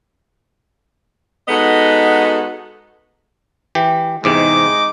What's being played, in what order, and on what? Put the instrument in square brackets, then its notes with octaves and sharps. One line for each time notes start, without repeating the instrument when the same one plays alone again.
[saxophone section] G#3 B3 D#4 F#4 A4 D#5
[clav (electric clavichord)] E3 G4
[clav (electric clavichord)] E2 G#2 C3 [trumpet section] G#3 D#4 D6